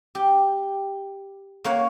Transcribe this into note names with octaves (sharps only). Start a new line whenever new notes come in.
G4
A#3 C#5 F5 F#5